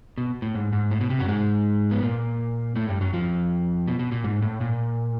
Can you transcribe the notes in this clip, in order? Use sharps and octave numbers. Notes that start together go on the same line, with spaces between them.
B2
A2
G#2
G#2
A2
B2
C3
F#2 F#3
G#2 G#3
B3
A#2 A#3
A2 A3
G2 G3
F#2 F#3
F2 F3
B2
B2
A#2
G#2
A2
A#2